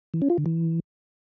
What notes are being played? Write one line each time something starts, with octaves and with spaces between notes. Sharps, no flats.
E3
C#4
F4
D3
E3